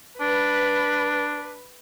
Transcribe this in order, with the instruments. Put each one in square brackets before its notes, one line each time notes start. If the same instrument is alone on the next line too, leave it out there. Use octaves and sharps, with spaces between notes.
[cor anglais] D4 [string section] B4